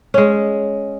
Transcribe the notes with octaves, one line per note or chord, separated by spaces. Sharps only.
G#3 C#4